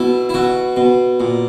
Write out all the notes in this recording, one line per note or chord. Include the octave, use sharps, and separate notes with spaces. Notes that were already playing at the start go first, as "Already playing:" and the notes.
Already playing: B2 E4
E4
B2 F#4
B2
A#2